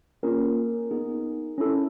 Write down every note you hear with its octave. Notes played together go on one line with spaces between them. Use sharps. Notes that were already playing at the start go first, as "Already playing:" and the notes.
A#3 C#4 F4 G#4 A#4
B3 D#4 G#4
C#4 E4 A4